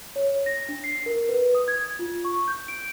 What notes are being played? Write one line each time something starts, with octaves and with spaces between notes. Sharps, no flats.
C#5
A#6
D4
C7
A#4
B4
D#6
G#6
F4
C#6
G6
D7